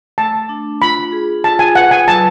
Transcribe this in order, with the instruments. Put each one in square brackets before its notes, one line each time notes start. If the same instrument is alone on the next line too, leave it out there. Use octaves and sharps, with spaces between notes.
[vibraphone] A3 [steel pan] A5
[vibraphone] D4
[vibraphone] F4 [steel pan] B5
[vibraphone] G#4
[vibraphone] F4 [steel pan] A5
[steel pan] G#5
[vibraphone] B4 [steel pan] F#5
[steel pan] G#5
[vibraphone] F#3 [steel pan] A5